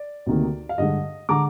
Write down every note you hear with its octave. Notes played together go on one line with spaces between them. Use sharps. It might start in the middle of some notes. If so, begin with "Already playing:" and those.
Already playing: D5
D2 C3 D#3 A#3
F5
G2 D3 G#3 D#5
D3 G#3 A#5 D6